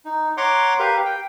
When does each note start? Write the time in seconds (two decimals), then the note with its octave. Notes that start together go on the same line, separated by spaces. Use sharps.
0.05 D#4
0.37 C#5 F#5 A#5 C6 D6
0.79 G4 A#4 B4 F5
1.05 G5